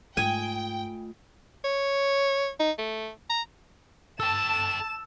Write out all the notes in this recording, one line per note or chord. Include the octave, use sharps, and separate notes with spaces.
G#2 A3 F4 G5 G#5
C#5
D#4
A3
A#5
A4 G5 A5 E6 E7